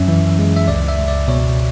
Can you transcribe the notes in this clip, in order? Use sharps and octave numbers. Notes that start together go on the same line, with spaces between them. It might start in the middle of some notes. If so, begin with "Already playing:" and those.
Already playing: F#2 C#4 E5
E3
G#3
E5
C#2 D5
E5
C#2
D5
B2 C#5